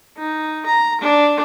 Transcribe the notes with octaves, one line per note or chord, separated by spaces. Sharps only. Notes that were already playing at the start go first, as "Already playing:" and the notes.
D#4
A#5
D4